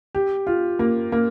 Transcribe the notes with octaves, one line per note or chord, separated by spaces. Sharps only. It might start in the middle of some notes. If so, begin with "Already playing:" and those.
G4
F4
A#3
A#3